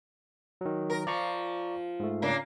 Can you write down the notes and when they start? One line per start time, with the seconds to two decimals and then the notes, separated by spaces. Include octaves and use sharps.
0.61 D#3 F#3
0.90 A#4
1.07 F3 D5 A#5 C#6
2.00 G#2 A3
2.22 C#3 A#3 D4